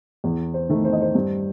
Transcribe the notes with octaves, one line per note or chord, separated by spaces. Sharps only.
E2
C5
D#3 A3
C5
D#5
C5
G2